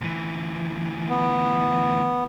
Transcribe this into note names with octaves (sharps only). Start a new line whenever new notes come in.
D2 E3
B3